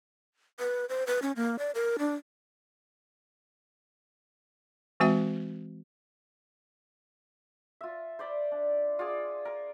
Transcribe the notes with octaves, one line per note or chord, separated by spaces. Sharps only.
B4
C5
B4
C#4
A#3
D5
A#4
D4
E3 G#3 C4 F#4 E5 G5
F4 E5
C5 D5 B5
D4
F4 G#4 D5
A#4